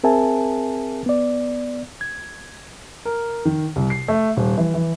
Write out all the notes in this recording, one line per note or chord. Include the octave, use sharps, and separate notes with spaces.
C4 G#4 A#4 E5 G#5 A5
B3 D5
G#6
A#4
D#3
C2
C7
A3
D#1
E3
E3